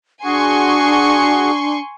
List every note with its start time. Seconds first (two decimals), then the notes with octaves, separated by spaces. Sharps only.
0.24 D4 F#4 G#4 G#5 C6 C#6